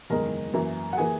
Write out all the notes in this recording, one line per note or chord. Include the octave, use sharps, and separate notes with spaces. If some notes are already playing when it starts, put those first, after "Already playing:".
F#1 E2 D#3 G#3 A#4 A#5
F#2 E3 A#3
F#5
E3 A#3 G#4 G#5